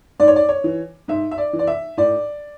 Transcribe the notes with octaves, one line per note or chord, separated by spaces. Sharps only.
G#2 D5
C#5
D5
C#5
E3
G#2 E5
E5
D5
E3
D5
E5
A2 D5